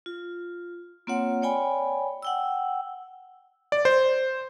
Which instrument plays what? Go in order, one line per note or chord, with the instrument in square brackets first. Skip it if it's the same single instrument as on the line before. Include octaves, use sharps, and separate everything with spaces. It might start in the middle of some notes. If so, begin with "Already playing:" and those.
[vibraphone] F4
A#3 C4 F4 C#5 F#5
C#5 D5 G5 G#5 B5
F#5 G5 E6
[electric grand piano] D5
C5